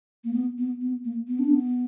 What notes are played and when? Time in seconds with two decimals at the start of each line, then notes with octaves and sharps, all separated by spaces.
0.24 A#3
0.33 B3
0.58 B3
0.81 B3
1.05 A#3
1.27 B3
1.39 D4
1.50 B3